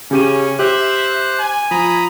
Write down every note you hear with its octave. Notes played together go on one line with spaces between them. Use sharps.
C#3 C#4 G4 D#7
G4 C5 E5 F#6
G#5
F3 A#5 B5 D#6